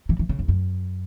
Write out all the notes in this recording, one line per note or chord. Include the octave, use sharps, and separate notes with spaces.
E3
E3
C#3
E2
F#2